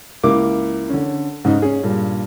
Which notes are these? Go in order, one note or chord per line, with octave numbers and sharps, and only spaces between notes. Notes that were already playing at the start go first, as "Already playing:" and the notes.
C#2 A#3 E4 D6
D3 C#4
G#2 C#3 D#4
C#4 G#4
G2 A#2